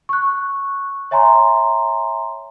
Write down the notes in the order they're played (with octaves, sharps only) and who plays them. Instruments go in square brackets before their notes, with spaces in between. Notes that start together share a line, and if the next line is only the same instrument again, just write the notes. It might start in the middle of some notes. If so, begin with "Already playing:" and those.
[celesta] C#6 F#6
C#5 E5 G#5 A#5 C6